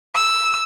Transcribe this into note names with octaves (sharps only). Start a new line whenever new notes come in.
E6